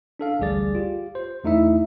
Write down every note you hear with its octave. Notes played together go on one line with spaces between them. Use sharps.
D4 A4 F5
A1 D2 G3 G#4 D5 A6
F4 G4
C5
E2 A3 D#4 E4 E5